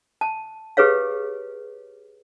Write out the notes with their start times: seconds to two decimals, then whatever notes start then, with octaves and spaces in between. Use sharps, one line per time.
0.21 A5
0.77 G4 G#4 B4 C#5 F5